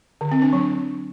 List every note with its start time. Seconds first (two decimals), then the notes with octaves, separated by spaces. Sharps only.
0.21 D3
0.32 C4
0.42 D4
0.53 F#3